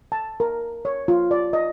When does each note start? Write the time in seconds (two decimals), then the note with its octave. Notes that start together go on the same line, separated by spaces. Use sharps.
0.12 A5
0.40 A#4
0.85 C#5
1.08 F4
1.31 D5
1.53 D#5